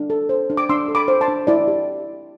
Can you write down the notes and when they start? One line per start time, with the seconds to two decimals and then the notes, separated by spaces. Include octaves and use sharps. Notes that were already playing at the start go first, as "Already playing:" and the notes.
Already playing: D4
0.10 A4
0.29 C5
0.50 D4
0.57 D6
0.69 D4 C6 E6
0.88 A4
0.95 B5 D6
1.08 C5
1.21 A5 C6
1.28 D4
1.47 E4 D5
1.68 G4